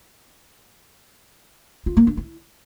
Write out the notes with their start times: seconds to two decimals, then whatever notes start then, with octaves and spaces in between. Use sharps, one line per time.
1.86 F4
1.97 A#3
2.07 D4
2.17 E4